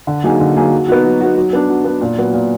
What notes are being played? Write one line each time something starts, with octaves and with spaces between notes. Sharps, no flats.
D3
F#3 A#3 D#4 G#4
D3
F#3 A#3 D#4 G#4
F#3
B3 D#4 F#4
F#3
B3 D#4 F#4
F#3
B3 D4
F#3
B3 D4
A#2
F#3 B3
A#2